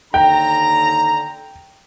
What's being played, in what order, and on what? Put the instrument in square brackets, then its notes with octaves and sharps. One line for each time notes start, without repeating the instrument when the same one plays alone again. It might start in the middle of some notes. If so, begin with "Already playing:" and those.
[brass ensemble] D#2 D3 A#5 [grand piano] G5